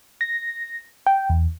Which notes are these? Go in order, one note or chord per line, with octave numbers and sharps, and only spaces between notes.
A#6
G5
E2